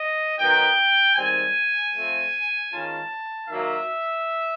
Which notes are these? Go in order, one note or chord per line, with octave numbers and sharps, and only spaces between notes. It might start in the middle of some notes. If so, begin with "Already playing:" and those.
Already playing: D#5
D#3 F#3 B3 D#4 G5
G#2 D#3 G3 C4 G#5
F3 A3 C4
D#3 G#3 C#4 F4 A5
D#3 F#3 A#3 E5